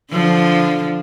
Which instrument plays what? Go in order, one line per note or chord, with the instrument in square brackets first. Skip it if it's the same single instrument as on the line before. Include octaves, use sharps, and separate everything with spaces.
[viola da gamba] D3 F3